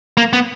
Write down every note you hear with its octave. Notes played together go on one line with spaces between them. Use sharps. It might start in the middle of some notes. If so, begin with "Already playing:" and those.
A#3
B3